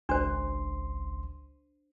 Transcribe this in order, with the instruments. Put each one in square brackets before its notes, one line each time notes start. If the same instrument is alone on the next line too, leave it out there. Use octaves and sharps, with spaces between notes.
[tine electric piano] G#1 C#2 C6 [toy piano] D4 C5